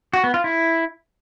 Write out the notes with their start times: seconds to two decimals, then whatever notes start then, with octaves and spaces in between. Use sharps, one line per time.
0.13 F#4
0.24 B3
0.34 F4
0.44 E4